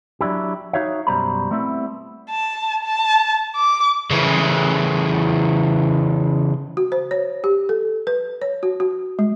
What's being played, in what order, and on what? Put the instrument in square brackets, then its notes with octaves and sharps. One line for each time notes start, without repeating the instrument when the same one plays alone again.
[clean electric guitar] F#3 D4 E4 G4
D#4 F4 F#4 C#5 E5 F5
F#2 B2 G3 C5 A#5 B5
G3 A3 B3 C4 E4
[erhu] A5
A5
D6
[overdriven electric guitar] C#3 E3
[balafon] F#4
C5
C#5
G4
A4
B4
C#5
F#4
F#4
G#3